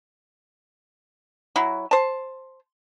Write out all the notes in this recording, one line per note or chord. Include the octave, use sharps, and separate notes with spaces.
F#3 E4 F#4
C5 A5